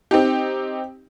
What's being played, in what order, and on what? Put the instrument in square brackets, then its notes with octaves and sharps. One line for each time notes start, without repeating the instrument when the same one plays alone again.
[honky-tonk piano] C4 D#4 G4